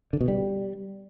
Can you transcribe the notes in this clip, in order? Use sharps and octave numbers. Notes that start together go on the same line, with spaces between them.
D3
B2
G3